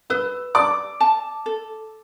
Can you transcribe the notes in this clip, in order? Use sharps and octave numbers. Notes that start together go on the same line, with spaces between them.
B4 E6
D5 D6
A5
A4